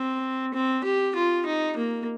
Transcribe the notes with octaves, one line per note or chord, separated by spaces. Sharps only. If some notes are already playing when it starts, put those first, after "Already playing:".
Already playing: C4
C4
G4
F4
D#4
A#3